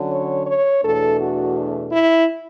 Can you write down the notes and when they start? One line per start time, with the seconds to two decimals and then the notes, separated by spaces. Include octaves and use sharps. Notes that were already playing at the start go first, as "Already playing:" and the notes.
Already playing: D3 F#3 C#4
0.10 C#5
0.46 C#5
0.82 E2 B2 A3 D4 A4
1.19 F#4
1.91 E4